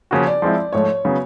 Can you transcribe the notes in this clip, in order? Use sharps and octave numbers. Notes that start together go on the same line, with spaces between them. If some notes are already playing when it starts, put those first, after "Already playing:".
C#3 F3 A#3 C#4 F#4
D5
F3 G#3 C4 E4
G#2 F3 A3 C#5
C#3 F#3 B3